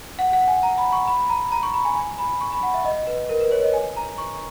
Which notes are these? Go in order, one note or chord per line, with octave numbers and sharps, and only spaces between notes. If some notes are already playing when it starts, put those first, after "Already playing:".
F#5
F#5
G#5
A#5
B5
C#6
B5
A#5
A#5
C#6
B5
G#5
G#5
B5
C#6
B5
F#5
E5
D#5
B4
A#4
B4
C#5
D#5
G#5
A#5
C#6